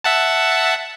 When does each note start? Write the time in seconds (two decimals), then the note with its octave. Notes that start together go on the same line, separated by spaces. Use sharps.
0.04 E5 F#5 A5